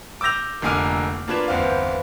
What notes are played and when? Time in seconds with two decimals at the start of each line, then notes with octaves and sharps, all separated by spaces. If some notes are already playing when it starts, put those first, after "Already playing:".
0.21 D6 E6 G6 A#6 F7
0.62 F1 D3 A#3 G#5 D6 F6
1.28 A#3 D4 F4 B4 G#6 E7
1.48 G1 E2 C4 F5